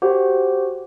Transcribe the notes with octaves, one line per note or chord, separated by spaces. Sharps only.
F#4 G4 C5 F#5